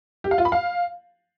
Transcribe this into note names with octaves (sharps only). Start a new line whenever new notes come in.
G4
F5
F4
B5
F5